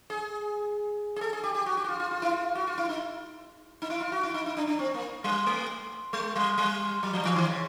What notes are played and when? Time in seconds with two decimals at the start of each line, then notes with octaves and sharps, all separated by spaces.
0.10 G#4
1.16 G#4
1.21 A4
1.33 G#4
1.44 G4
1.55 G4
1.66 F#4
1.77 G4
1.84 F#4
1.88 F4
2.00 F4
2.11 F4
2.22 E4
2.33 F4
2.55 F#4
2.67 F4
2.78 E4
2.89 D#4
3.82 D#4
3.90 E4
4.00 F4
4.12 F#4
4.23 E4
4.34 D#4
4.46 D#4
4.57 D4
4.67 D4
4.79 C4
4.94 A#3
5.24 G3
5.46 A3
6.13 G#3
6.36 G3
6.58 G3
7.03 F#3
7.13 F3
7.25 E3
7.36 D#3
7.47 C#3